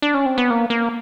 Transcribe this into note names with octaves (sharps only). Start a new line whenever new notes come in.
D4
C#4
C4
B3
A#3
A#3